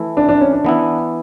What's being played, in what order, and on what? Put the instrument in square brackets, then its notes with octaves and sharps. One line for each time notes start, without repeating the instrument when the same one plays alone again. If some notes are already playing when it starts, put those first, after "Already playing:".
Already playing: [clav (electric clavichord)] E3 A3 E4
[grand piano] D4
D4
C#4
D4
[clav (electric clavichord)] E3 B3 E4